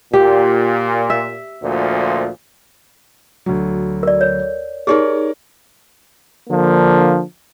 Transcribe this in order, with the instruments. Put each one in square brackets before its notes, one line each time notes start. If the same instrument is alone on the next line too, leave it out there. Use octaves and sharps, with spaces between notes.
[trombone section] A#2 [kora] G4
[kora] E5
[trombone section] D2 A#2 F3
[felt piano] D2 F#3
[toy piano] A#4 D5
C#5
[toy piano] D#4 G4 G#4 [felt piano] A#4 C#5 D5
[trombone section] D3 F3 A#3 D4